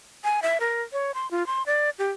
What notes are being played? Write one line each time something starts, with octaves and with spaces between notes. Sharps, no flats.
G#5
E5
A#4
C#5
C6
F4
C6
D5
G4